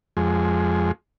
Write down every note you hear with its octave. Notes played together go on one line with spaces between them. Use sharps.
F2 G#3